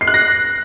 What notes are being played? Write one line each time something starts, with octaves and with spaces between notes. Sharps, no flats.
C7
F#6
A#6